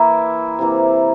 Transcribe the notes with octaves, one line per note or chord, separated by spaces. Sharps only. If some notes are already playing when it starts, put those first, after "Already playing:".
Already playing: E3 A#3 E4
C3 E3 A#3